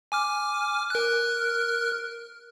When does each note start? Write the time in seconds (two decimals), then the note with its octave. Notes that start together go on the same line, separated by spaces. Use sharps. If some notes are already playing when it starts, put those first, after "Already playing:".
0.12 G#5 D6 F6
0.90 A#4 F6 F#6